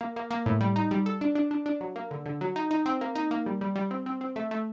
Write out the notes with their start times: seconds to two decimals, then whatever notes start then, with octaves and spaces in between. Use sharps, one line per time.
0.01 A#3
0.16 A#3
0.31 A#3
0.46 A2
0.61 G3
0.76 D#4
0.91 G3
1.06 A4
1.21 D4
1.35 D4
1.51 D4
1.66 D4
1.81 F#3
1.96 A#3
2.11 D3
2.26 D3
2.41 F#3
2.56 D#4
2.71 D#4
2.86 C4
3.01 A#3
3.15 D#4
3.31 A#3
3.46 G3
3.61 G3
3.76 G3
3.91 C4
4.06 C4
4.21 C4
4.36 A3
4.51 A3